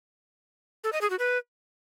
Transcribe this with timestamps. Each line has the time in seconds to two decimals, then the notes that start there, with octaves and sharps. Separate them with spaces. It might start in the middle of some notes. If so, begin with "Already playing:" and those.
0.84 A4
0.92 D#5
1.01 G#4
1.10 F#4
1.19 B4